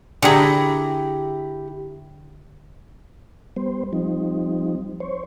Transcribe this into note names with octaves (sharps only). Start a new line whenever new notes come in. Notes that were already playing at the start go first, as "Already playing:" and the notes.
D3 E4 G4 G#4 A#5
G3 B3 C5
F3 G3 C4 D#4
C5 C#5